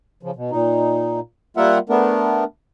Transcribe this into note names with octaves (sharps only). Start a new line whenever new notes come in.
C#3 F3
B2
A#2 D#4
G3 A#3 F4 A#4 E5 F#5
A3 B3 D4 A#4